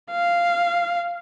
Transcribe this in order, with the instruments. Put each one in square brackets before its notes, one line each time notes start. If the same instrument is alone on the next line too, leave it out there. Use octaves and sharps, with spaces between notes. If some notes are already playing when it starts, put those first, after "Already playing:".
[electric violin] F5